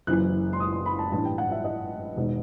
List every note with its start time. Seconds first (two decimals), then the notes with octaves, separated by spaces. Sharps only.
0.07 F#1 F#2 E3 F#6
0.53 C6
0.60 D#6
0.72 C6
0.86 B5
0.99 A5
1.12 A1 G2 E3 A5
1.25 G5
1.38 F#5
1.52 E5
1.64 D#5
2.17 E1 D#3